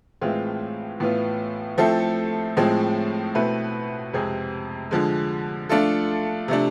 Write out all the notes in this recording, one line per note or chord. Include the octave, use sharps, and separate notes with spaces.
A2 E3 G#3 C4 F4
A2 E3 B3 F4
F3 A3 C4 E4 A4
A2 F3 G#3 C4
B2 A3 C4 E4 B4
F2 C3 G#3 C4 G#4
D3 F3 G#3
F3 A3 D4 F4 A4
C3 F3 A3 D4